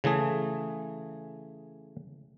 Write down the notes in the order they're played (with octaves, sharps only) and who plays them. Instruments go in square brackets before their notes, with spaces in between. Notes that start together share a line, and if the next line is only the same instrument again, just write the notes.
[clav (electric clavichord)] C#3 E3 A3 G#4